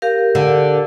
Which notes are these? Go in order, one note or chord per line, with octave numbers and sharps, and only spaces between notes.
G4 A#4 F5
D3